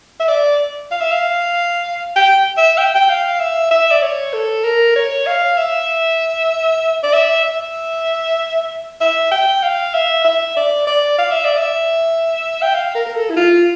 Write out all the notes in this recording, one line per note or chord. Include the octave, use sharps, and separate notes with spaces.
E5
D5
F5
E5
F5
G5
E5
G5
G5
F5
E5
E5
D5
C#5
A4
A#4
C#5
F5
E5
D5
E5
E5
E5
G5
F5
E5
E5
D5
D5
F5
E5
D5
E5
G5
F5
A#4
A#4
A4
E4
F4